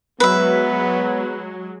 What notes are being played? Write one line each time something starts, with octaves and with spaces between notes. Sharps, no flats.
F#3 G#3 B3 B4 E5